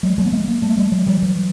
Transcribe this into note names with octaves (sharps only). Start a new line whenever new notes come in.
F#3 G#3
F#3 G#3
B3
G#3 A#3
G#3 A#3
G3 A3
G3 A3
F#3 G#3
F3 G3
E3 F#3